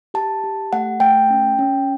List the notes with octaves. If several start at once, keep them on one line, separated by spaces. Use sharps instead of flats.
G4 A5
G4
A3 F#5
A3 G5
C#4
C#4